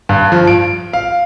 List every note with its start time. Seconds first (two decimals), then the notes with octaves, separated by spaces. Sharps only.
0.09 G2
0.32 F3
0.47 D7
0.93 F5